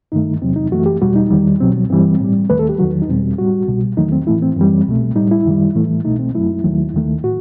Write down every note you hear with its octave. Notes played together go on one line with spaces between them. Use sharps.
G2 D#3 A3 D#4
E2 C3 F#3 C4
D#4
F#2 E3 A3 F#4
G4
E2 B2 G3 F#4
D#4
E2 D#3 G3
C2 B2 F#3 C4
G2 E3 G3 C4
A2 G3
D#2 D#3 A3 B4
A4
G4
E2 D#3 F#3 F#4
D#4
E2 B2 G3 C4
A2 G3 F#4
C2 B2 G3
E2 D#3 F#3 A3 D#4
C4
A2 E3 A3 E4
C4
F#2 E3 G3
C2 B2 A3
A2 G3 D#4
E4
F#2 D#3 G3
A2 E3 A3
C2 B2 A3 D#4
C4
F#2 F#3 A3 E4
D#2 D#3 F#3 A3
D#2 D#3 A3
A2 F#4